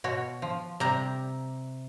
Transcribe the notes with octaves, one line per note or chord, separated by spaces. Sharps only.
B2 F#4 C#5
F3
C3 G3 A#5